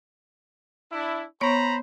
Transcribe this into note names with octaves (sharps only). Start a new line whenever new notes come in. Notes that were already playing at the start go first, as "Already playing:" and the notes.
D4 E4
B3 C5 C#5 A#5 B5 C#6